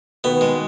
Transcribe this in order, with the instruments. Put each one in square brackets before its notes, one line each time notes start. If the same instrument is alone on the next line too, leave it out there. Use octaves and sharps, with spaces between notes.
[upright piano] B2 D#3 [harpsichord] B3
[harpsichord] G#3